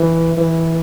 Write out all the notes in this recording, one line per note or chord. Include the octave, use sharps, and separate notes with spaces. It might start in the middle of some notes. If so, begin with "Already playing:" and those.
Already playing: E3
E3